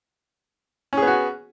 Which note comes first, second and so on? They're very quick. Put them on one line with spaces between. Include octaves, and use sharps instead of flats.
C#4 G#4 B3 F#4